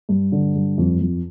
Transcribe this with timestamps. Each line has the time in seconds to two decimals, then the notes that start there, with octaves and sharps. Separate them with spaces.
0.09 G2
0.32 D3
0.55 G2
0.78 F2
1.01 F2